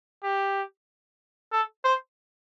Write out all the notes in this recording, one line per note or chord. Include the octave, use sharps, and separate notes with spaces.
G4
A4
C5